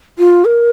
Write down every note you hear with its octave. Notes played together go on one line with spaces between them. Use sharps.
F4
A#4